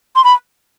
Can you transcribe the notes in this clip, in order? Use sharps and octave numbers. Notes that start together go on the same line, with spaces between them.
C6
B5